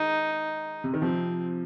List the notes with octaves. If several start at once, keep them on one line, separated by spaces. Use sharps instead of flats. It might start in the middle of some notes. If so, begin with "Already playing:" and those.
Already playing: D#3 G#3 D#4
C3
D#3
C3 F3 C4